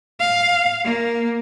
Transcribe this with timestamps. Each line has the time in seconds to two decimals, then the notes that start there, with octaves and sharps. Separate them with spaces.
0.20 F5
0.85 A#3